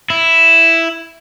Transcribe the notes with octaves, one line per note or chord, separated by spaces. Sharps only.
E4